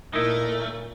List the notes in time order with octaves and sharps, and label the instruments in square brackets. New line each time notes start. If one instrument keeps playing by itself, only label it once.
[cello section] A#2 [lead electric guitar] A3 [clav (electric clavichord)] D#4 E4 [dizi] A#4